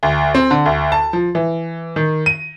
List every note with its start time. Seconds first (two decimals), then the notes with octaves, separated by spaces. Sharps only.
0.03 D2
0.35 C4
0.51 D3
0.66 D2
0.92 A5
1.13 F3
1.35 E3
1.96 D#3
2.26 D#7